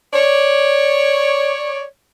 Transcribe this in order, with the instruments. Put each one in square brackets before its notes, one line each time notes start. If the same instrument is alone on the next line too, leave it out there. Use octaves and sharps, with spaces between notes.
[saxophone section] C#5 D5